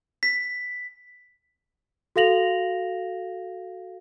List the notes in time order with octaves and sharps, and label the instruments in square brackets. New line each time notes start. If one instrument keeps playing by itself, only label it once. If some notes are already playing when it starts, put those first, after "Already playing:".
[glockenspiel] B6
[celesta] F#4 A4 F5 A#6 F7 F#7